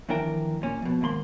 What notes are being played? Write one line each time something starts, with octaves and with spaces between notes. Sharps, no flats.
D#2 E3 F3 D4 A#4 G5
A#2 C#4
F2 B2
D#2 G#2 A#3 B5 C6